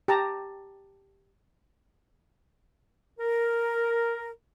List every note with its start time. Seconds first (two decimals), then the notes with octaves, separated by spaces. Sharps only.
0.08 G4 A5 A#5
3.20 A#4